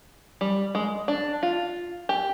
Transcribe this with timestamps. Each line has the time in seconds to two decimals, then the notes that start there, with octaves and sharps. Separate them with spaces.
0.41 G3
0.75 G#3
1.08 D4
1.43 F4
2.09 G4